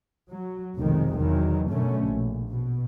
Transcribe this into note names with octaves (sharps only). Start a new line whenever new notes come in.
F#3
F1 B1 F2 C3 D#3 G#3
E2 D#3 F#3
F#2 B2 D3 A3 C#4
A#1
B2